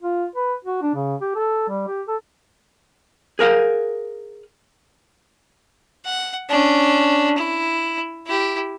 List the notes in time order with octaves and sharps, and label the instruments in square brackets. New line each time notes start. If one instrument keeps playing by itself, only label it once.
[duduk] F4
B4
F#4
D4
C#3
G4
A4
G3
G4
A4
[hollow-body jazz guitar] G#4 A#4 F5 F#5
[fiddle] F#5
C#4 D4
E4
E4 G4